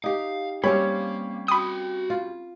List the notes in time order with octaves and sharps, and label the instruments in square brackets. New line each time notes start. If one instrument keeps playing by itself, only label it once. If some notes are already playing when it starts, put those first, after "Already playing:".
[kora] D#4 G4 [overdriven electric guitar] F5
[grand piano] G3 C#5 [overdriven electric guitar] A#3 [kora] C4 C#4 G4 [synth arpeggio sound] B5
[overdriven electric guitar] F#4 G5 [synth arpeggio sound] B5 D#6
[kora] F4